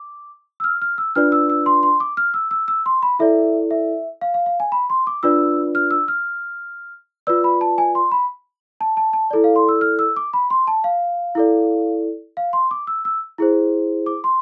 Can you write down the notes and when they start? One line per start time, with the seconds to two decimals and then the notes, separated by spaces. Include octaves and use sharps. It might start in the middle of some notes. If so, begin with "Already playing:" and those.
Already playing: D6
0.60 E6
0.64 F6
0.82 F6
0.98 E6
1.15 D4 F4 B4 D5 F6
1.32 E6
1.50 E6
1.66 C6
1.83 C6
2.00 D6
2.17 F6
2.34 E6
2.51 E6
2.68 E6
2.86 C6
3.03 B5
3.19 E4 A4 D5 E5
3.71 E5
4.21 F5
4.34 F5
4.46 F5
4.60 G#5
4.72 B5
4.90 C6
5.07 D6
5.23 D4 F4 B4 D5 E6
5.75 F6
5.91 E6
6.08 F6
7.27 F4 B4 D5 E6
7.44 B5
7.61 A5
7.78 G#5
7.95 C6
8.12 B5
8.81 A5
8.97 A5
9.13 A5
9.31 E4 A4 D5
9.44 F5
9.56 C6
9.69 E6
9.81 F6
9.99 E6
10.16 D6
10.33 B5
10.50 C6
10.67 A5
10.84 F5
11.35 E4 A4 D5
12.37 F5
12.53 C6
12.71 D6
12.87 E6
13.05 E6
13.38 E4 G#4 C5
14.06 D6
14.24 C6